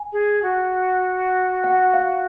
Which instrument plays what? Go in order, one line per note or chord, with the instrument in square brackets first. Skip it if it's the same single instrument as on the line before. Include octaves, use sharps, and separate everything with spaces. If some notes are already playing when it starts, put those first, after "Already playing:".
Already playing: [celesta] G#5
[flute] G#4
F#4
[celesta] F#5
F5